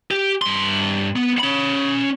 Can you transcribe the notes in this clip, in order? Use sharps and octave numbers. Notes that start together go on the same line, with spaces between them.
G4
G2 C6
B3
C#4 B5